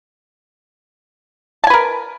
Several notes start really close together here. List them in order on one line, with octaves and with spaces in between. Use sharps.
A5 G#5 B4 A#4